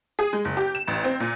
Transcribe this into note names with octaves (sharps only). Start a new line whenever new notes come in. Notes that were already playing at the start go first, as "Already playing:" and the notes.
G#4
G#3
F#1
G4
E7
A1
C4
A#2